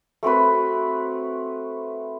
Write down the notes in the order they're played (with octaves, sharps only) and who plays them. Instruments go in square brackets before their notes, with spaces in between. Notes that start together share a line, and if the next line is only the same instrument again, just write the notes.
[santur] A3 C4 F#4 B4